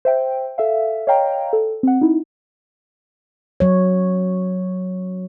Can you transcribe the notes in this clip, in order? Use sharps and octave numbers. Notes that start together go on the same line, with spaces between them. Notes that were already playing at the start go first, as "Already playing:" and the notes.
C5 E5 G5
A4 E5 F5
C#5 D#5 F5 G5 A#5
A4
C4 F#5
D#4 E4
F#3 C#5